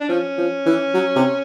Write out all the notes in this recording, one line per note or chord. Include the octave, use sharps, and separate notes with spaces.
D4
F3 C#4
F3
E3
F#3
C3